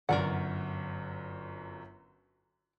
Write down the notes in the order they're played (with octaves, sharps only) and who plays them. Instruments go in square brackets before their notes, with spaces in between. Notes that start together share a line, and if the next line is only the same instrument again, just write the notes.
[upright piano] G1 F#2 F#4 [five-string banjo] A#4 D5 F#5